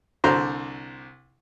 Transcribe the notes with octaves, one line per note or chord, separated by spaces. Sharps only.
C2 D3 C5 A#5 C6